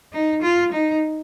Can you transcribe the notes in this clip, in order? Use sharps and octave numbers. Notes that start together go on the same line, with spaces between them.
D#4
F4
D#4